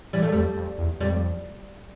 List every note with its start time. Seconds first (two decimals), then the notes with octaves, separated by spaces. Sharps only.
0.13 E3 G3
0.23 A3
0.32 F2 G3
0.56 F2
0.78 E2
1.01 F2 G3